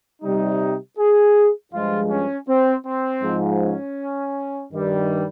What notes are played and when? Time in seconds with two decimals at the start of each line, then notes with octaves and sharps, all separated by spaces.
0.22 C3 G3 D#4
0.98 G#4
1.72 G2 F3 G#3 F4
2.10 C#4
2.48 C4
2.85 C4
3.22 G#2 F3 G#3
3.60 C#4
4.71 G2 D#3 G3